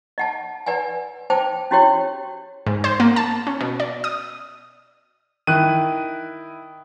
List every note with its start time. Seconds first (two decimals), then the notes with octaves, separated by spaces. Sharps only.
0.18 D#5 F#5 A5
0.66 B4 D5 F#5 G#5
1.30 C5 G5 A5 D6
1.71 C#4 E4 F#4 G4 C#5 G5
2.66 G#2
2.84 C5
3.00 A#3
3.16 A5
3.47 C#4
3.61 B2
3.80 D5
4.04 D#6
5.47 D#3 E4 F#6 D#7